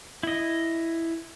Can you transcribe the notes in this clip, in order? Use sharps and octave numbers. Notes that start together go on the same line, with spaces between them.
E4 D#5